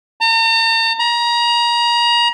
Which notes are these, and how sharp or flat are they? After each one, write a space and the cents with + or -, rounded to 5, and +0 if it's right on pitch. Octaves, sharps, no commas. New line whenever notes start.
A#5 -45
A#5 +30